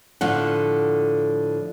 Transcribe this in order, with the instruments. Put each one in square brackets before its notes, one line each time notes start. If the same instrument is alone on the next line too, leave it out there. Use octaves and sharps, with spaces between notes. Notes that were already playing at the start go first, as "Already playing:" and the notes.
[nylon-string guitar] A2 D3 F3 F#5